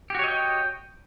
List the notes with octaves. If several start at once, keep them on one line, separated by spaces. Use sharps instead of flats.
F#4 G4 C#5 D#5 G5